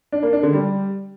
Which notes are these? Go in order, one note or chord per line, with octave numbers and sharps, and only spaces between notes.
D4
A#3
D4
D3
G3